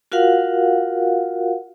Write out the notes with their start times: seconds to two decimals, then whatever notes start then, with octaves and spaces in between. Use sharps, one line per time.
0.12 F4 F#4 A#4 F5 F#5